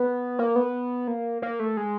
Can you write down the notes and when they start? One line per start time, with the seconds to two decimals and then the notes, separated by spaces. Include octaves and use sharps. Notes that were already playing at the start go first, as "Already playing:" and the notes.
Already playing: B3
0.39 A#3
0.56 B3
1.08 A#3
1.42 A#3
1.60 A3
1.77 G#3